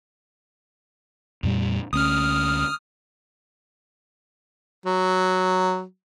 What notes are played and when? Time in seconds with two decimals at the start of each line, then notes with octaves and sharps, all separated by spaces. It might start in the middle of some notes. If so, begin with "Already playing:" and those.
1.43 F2 A#2 G3
1.93 D2 C#4 D#6 F6
4.86 F#3